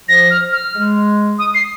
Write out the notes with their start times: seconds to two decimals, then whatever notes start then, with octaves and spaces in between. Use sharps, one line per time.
0.09 F3 A#6
0.31 F6
0.52 F6
0.74 G#3
1.39 D#6
1.55 C7